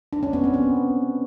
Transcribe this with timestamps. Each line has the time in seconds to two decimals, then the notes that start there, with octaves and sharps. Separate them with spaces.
0.13 D4
0.23 C#4
0.33 B3
0.44 C4
0.54 B3